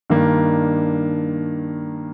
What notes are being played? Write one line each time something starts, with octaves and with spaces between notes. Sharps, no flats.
G2 D#3 A#3 D4